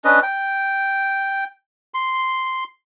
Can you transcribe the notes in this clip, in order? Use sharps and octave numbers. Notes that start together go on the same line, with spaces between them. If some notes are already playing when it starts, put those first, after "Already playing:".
C#4 D4 B4 D#5
G5
C6